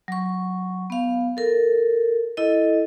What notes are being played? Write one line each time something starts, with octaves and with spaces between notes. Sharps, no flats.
F#3 C#6
B3 F5
A4 A#4
E4 A4 D#5